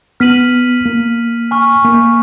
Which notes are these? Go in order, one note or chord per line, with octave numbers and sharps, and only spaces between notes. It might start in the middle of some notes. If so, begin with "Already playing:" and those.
B3 F6 B6 D#7 F#7
A#3
G#5 C#6 F6
A#3